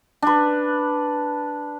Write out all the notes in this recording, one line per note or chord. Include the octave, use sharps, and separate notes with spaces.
D4 B4